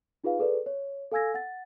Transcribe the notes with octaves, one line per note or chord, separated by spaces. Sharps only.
D#4 F4 G#4 B4 F5
G#4 A4 B4 D5
C#5
A4 F5 G#5 E6 G#6 A#6
F#5 A6